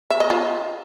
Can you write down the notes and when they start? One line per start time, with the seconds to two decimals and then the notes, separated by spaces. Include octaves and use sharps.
0.10 E5
0.20 D#5
0.30 F4